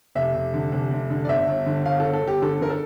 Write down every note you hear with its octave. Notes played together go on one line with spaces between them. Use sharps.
F1 E5
F1
D3
F1
F1
D3
D5
G1 E5
G1
D3
G1 F5
G1 A4
A4
G1 G4
D3 A4
D3 A#4
A4